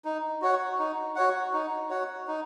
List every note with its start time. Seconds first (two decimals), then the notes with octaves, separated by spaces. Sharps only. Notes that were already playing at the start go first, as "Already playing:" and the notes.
0.05 D#4
0.42 F#4 C#5 F#5
0.79 D#4
1.16 F#4 C#5 F#5
1.53 D#4
1.90 F#4 C#5 F#5
2.28 D#4